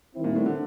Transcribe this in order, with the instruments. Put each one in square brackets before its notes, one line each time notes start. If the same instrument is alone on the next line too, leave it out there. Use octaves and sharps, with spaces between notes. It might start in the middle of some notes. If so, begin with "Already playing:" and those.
[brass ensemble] D#3 G3 C4 E4
[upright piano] A#2
A2
D3